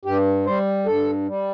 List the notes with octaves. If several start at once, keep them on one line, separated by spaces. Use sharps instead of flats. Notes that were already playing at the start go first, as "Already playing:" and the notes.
G2 G4
G3 C5
G2 A4
G3